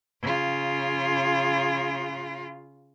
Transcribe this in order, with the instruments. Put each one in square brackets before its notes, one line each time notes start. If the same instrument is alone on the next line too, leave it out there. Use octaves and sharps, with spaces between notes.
[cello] C#3 F4